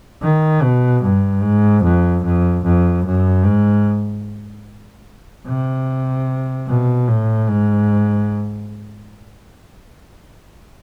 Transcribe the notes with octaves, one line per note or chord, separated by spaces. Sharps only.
D#3
B2
G2
G#2
F2
F2
F2
F#2
G#2
C3
B2
A2
G#2